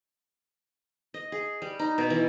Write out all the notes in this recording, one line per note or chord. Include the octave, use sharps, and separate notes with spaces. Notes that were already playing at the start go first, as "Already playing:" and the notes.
D#5
G#4
G3
D#4
B2
E3